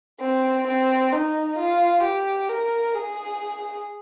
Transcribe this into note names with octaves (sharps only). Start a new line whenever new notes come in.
C4
C4
D#4
F4
G4
A#4
G#4